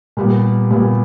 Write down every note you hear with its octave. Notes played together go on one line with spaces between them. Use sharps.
A#2 G3 B3
A#2 G3 B3